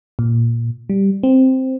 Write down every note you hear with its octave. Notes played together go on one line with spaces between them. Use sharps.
A#2
G3
C4